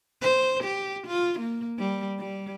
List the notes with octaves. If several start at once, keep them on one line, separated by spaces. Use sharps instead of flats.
C5
G4
F4
A#3
G3
G3